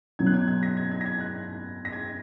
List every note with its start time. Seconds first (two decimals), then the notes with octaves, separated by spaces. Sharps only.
0.19 B2 F#3 G#6
0.26 F#6
0.34 G#6
0.48 G#6
0.63 A#6
0.77 G#6
0.91 G#6
1.01 A#6
1.06 G#6
1.20 F#6
1.85 A#6
1.92 G#6